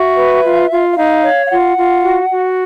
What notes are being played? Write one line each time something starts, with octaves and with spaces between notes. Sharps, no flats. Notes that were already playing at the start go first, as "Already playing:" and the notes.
Already playing: F#4 E5
B4
F4
F4
E5
D#4 F5
C#5
F5
F4 F#5
F4
F#4
F#4